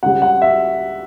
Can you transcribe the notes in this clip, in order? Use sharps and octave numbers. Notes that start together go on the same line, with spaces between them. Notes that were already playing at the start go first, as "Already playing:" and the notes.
C#2 C#3 G3 F#5
F#5
E5